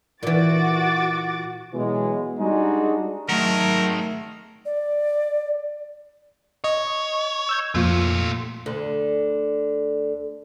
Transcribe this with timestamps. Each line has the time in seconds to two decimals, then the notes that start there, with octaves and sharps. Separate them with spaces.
0.23 A#2 E3 F#4 D6 A6
1.74 B2 E3 F#3 G#3
2.39 G3 G#3 D4 D#4 F#4 G#4
3.29 D#3 F#3 G#3 A3 A#4
4.65 D5
6.64 C#5 D#5
7.49 E6 G6 G#6
7.75 F2 A#2 F3 A3 F4
8.66 D2 D3